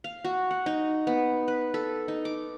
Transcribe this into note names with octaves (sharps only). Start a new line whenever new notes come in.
F5
F#4
F#5
D#4
B3
B4
A4
D#4
D6